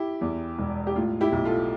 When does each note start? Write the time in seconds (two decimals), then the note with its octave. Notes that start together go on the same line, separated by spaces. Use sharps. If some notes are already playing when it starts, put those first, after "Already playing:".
Already playing: E4 G4
0.21 E2
0.58 E1
0.87 G4
0.96 A2 F4
1.21 E4 G4
1.32 B1
1.45 F4 A4